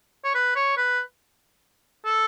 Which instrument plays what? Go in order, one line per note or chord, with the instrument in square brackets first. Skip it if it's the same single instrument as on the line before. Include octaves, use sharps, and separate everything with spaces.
[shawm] C#5
B4
C#5
B4
A4